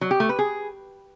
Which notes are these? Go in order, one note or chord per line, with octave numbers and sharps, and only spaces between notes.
F#3
G4
A3
B4
G#4